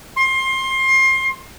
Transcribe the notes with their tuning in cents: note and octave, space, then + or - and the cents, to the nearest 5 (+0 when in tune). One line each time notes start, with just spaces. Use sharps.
C6 +25